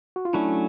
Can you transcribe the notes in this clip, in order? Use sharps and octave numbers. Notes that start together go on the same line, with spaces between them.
F#4
F4
F#3 A3 C#4 D4 E4